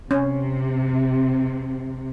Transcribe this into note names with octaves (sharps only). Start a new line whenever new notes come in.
C3 C#4